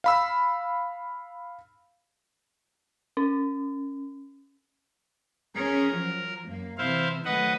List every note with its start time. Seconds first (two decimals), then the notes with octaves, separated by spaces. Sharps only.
0.04 F5 B5 E6
3.17 C#4
5.56 C#4 G#4 A#4
5.93 F3 F#3
6.47 F#2 A#3
6.78 C3 E3 E4 C5 F5
7.25 D#3 F#3 A3 B4 D#5 F#5